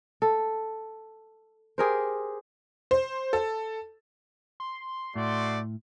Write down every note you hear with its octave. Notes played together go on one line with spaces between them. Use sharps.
A4
G4 G#4 A#4 C5
C5
A4
C6
A2 A3 F#4 D5